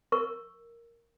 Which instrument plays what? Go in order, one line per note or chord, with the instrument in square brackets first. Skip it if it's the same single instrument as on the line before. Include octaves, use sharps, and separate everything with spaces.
[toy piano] A#4 C#6